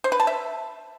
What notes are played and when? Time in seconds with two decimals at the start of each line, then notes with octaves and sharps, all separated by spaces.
0.04 C5
0.12 B4
0.20 A5
0.27 E5